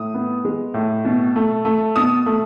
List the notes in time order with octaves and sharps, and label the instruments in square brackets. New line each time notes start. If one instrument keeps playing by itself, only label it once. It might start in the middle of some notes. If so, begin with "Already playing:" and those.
Already playing: [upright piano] A2 D#6
B3
G#3
A2
B2
A3
A3
B2 D#6
A3